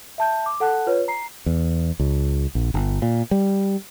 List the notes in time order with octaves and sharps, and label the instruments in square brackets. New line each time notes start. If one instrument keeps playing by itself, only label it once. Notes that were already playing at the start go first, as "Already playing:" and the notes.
[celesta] E5 A5 G6
D6
A4 F#5 A5 F#6
F4 B4 C#5
A#5 C7
[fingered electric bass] E2
C#2
A#1
G1
A#2
G3